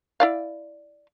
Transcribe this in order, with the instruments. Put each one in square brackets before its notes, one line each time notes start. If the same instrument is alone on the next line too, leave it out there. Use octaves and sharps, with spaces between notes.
[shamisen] E4 D5 F5